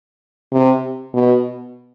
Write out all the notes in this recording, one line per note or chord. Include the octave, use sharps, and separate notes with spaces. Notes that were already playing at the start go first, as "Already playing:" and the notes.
C3
B2